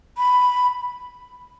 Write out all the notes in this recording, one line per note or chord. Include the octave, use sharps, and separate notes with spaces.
B5